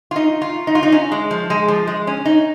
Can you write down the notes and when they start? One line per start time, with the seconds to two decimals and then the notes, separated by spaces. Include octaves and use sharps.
0.11 F4
0.16 D#4
0.41 F4
0.67 D#4
0.75 F4
0.83 D#4
0.92 C#4
1.12 G#3
1.31 F3
1.50 G#3
1.68 F3
1.87 G#3
2.07 C#4
2.25 D#4